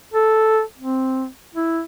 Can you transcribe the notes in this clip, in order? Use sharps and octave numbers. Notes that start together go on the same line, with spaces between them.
A4
C4
E4